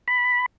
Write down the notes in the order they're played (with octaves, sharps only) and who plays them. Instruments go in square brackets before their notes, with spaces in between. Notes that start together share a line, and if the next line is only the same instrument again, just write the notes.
[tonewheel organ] B5